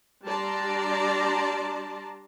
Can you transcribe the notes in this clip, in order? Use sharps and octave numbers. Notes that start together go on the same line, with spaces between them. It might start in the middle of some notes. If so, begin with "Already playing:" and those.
G3 D4 D5 A5 A#5 C6